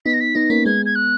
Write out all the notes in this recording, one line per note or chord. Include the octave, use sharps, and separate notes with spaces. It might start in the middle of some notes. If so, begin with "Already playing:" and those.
B3 D#4 B6
A#6
B6
B3 D#4 A#6
A#3 C#4 B6
G#3 B3 G#6
G#6
F#6